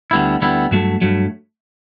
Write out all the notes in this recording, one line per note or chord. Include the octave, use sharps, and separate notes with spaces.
D2 D3 G3 B3 E4
D2 D3 G3 B3 E4
G2 F#3 A3
G2 F#3 A3